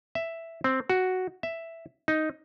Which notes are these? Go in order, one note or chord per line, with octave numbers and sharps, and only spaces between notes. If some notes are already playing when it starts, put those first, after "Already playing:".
E5
C4
F#4
E5
D#4